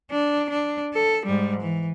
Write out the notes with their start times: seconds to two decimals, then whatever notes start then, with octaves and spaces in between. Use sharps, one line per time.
0.11 D4
0.50 D4
0.93 A4
1.26 G#2 G3
1.61 E3